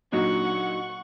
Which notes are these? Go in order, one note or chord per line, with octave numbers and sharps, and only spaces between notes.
A#2 F#3 D4 D#4 F#4 F#5 C#6